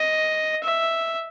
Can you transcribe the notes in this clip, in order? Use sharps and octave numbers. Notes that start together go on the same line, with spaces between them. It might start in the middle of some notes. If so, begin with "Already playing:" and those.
Already playing: D#5
E5